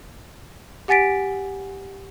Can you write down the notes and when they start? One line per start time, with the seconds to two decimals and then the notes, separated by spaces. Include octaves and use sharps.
0.88 G4 F#5 G#5 A6 B6 D7